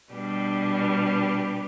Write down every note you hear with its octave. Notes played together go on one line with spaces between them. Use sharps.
B2 G3 D4 G4 B4